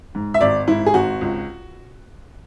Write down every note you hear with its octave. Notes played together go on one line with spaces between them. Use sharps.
G#2
E5
G#1 D5
G#2 E4
G#4
G#1 F#4
C#2